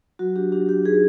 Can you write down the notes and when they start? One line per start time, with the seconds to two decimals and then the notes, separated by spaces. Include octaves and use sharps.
0.19 F#3 F#4
0.36 D4 G4
0.52 D4 G4
0.69 F#3 G4
0.85 D#4 G#4